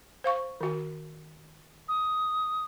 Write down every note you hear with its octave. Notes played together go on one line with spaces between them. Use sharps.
C5 F5 C#6
D#3 F#4
D#6